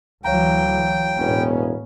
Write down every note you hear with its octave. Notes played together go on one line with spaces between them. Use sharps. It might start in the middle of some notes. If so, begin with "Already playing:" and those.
D2 E3 F#3 C#5 F5 G5 A#5
E1 A2 B3 C#4